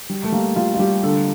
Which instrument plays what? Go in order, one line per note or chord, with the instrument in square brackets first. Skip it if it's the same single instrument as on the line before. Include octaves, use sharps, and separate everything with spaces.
[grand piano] G3
[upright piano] A3
[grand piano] G3 [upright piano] A#3
[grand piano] G3 [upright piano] F4
[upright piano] F4
[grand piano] G3 [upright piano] G4
[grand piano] D3 [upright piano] A4